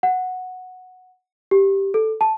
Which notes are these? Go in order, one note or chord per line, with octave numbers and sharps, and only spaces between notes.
F#5
G4
A4
A5